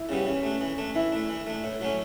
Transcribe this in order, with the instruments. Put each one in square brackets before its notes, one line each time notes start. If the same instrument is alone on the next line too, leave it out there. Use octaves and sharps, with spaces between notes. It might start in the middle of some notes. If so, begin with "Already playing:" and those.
Already playing: [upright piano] E4
[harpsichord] C#3 G3 B3 [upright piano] C#4
[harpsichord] E3 [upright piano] C#4
[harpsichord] A3 D4
E3
A3 D4
[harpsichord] E3 [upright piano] E4
[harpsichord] A3 D4
E3
A3 D4
A2
F#3 A3 C#4